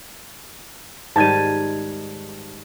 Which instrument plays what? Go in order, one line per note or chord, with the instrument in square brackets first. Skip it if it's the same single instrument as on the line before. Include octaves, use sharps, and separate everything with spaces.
[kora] G#2 D#3 G3 [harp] A5 G#6 D#7